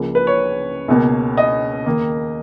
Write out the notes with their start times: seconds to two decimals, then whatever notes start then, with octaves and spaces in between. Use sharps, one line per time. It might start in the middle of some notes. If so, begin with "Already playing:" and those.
Already playing: C#2 C#3 F3 A#3
0.15 B4
0.27 C#5
0.88 C#2 B2 A#3
1.38 D#5
1.86 D#2 D#3 A#3